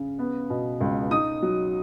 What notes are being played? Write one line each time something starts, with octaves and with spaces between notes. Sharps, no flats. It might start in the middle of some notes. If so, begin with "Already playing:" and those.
Already playing: C#3
B3
B2
C#2
D#4 D#6
F#3